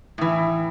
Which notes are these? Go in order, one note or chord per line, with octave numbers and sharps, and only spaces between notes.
A2 E3